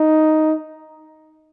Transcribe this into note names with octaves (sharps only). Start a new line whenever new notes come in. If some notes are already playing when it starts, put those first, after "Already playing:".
Already playing: D#4